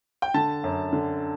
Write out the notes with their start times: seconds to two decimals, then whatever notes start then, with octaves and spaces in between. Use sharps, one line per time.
0.22 G5
0.34 D3 A5
0.64 F#2
0.93 D3